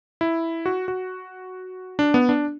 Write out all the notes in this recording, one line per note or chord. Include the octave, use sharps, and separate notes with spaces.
E4
F#4
F#4
D4
B3
D4